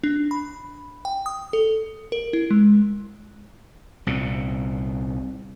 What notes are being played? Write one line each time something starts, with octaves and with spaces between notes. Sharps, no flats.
D4
B5
G5
D#6
A4
A#4
E4
G#3
C2 A#2